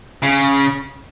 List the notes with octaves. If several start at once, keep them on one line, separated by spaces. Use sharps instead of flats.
C#3